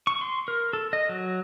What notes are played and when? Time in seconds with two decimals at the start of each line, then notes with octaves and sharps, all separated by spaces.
0.07 C#6
0.21 C6
0.48 A#4
0.73 A4
0.93 D#5
1.09 F#3